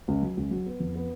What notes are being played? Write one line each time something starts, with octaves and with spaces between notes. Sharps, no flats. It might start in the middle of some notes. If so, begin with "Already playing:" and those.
C#2
F#3
C#2
F#3
B3
F2
B3